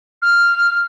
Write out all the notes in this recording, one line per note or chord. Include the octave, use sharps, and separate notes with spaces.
F6